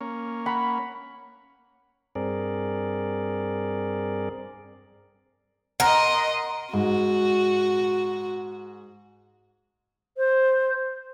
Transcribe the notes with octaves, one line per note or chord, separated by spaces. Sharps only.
A#3 C#4
F#5 A#5 B5
G2 C4 G#4 A#4 D5
A#4 D#5 F#5 A#5 C6
G#2 F#4
C5